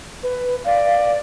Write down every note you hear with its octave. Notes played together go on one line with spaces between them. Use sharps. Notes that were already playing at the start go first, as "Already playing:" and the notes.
B4
D5 F5